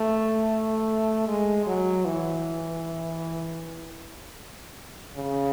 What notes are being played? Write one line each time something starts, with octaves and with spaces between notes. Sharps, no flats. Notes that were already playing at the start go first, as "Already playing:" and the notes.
Already playing: A3
G#3
F#3
E3
C#3